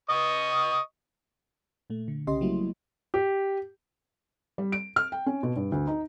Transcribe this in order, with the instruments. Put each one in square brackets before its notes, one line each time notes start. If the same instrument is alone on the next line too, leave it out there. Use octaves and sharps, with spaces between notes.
[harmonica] D#5 C#6 D#6
[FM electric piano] A#2 A3
D3
B1 C#3 C#4 G4 D#5 C6
F#3 G3 A3 A#3 E4 F#4
[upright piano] G4
[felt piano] G3
D7
F6
G5
C#4
B2
G2
D2
D#4